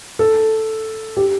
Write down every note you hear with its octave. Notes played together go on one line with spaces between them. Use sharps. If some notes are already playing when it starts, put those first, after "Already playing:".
A4
G4